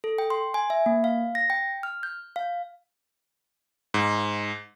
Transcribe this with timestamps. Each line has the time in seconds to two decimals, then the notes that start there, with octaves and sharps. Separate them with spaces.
0.04 A4
0.18 G5
0.30 C6
0.54 G#5
0.70 E5
0.86 A#3
1.04 F5
1.35 A#6
1.50 G5
1.83 F6
2.03 G6
2.36 F5
3.94 G#2